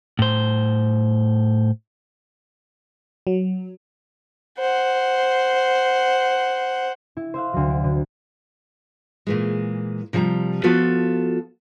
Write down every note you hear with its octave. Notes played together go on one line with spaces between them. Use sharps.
A2 C5
F#3
C5 F#5
E4
C5 E5 F5 F#6
D2 F#3
D7
D3
A#2 E3 G#3
C3 F3 G3 A5 A#5
F3 B3 F4 F#4 A4